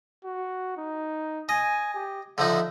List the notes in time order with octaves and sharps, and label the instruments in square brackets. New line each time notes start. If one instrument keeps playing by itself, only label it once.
[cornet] F#4
D#4
[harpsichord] D#5 [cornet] G#5
[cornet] G4
[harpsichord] D3 F3 D#4 [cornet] E5